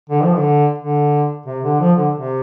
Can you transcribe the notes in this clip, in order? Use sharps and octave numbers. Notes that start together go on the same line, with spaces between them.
D3
F3
D3
D3
C3
D3
F3
D3
C3